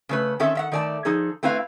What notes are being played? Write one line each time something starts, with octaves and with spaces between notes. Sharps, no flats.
C#3 A3 B4
D#3 C4 C#4 A4 E5
D#3 E5 F#5
D#3 A3 D5 F#5 A5
F3 D#4 G#4 A4
A3 C4 E4 B4 F5